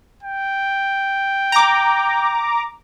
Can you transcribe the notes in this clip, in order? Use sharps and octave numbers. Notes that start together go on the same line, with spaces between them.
G5
A#5 D6